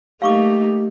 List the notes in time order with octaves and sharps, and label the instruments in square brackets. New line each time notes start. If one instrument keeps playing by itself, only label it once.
[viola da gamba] A3 A#3 D#4 [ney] G4 [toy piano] F5 C#6 D6